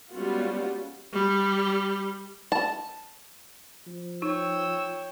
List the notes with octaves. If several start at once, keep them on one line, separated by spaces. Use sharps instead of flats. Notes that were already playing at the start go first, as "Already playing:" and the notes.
G3 G#3 B3 C#4 F4 F#4
G3
A5
F3
D#4 C#5 G5 E6